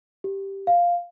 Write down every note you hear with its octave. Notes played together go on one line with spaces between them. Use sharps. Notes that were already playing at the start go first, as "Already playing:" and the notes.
G4
F5